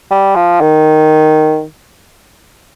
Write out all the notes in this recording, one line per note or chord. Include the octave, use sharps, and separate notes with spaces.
G3
F3
D#3